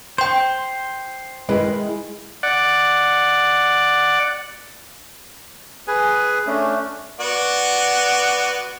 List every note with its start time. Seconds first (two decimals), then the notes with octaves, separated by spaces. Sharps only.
0.18 C5 G5 C6
1.49 D#3 G#3 E4 B4
2.43 D5 F#5
5.88 G#4 B4 G#5
6.47 A3 C#4 D4
7.20 B3 F#4 D5